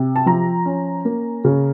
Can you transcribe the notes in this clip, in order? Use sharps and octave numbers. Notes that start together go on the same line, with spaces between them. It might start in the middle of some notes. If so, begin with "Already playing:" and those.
Already playing: C3
A5
F3 A#5
C#4
A#3
C#3